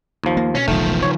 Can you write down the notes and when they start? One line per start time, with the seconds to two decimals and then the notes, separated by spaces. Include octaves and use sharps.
0.24 D#2 F3
0.37 A#3
0.55 B2 C#4
0.68 E1 B1 D#3 F3 A3
1.03 C#5